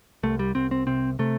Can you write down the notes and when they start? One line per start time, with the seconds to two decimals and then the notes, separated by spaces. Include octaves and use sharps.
0.23 C2 A3
0.39 G3
0.55 C2 C4
0.71 C4
0.87 C3 C4
1.19 C3 A3